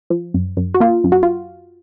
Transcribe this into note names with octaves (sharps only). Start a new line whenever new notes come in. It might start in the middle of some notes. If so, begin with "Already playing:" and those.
F3
F#2
F#2
F#4
A#3 F4
F#2
F#4
F4